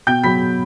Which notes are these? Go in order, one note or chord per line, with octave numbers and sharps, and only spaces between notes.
B2 G5 G6
F#3 B5 B6